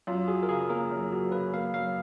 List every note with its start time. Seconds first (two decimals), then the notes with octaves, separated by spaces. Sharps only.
0.07 F#2 F4
0.28 F#3 G#4
0.43 A#4
0.49 C#3 G#4
0.70 A#3 A#4
0.91 F#2
1.12 F#3
1.32 C#3 B4
1.53 A#3 F5
1.74 F#2 F5